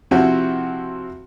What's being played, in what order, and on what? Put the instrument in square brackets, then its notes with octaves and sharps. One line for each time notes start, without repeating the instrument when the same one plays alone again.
[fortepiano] C3 F3 C4 E4 F#4